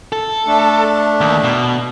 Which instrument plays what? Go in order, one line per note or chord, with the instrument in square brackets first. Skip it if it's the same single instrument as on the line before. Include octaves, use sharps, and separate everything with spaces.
[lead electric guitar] A4
[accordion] A3 D4
[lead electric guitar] D#2
B2